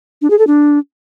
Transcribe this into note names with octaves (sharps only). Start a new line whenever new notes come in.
D4
G#4
A4
D4